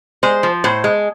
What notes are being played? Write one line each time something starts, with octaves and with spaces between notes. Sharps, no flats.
G#3 C5
F3
A2 C5
G#3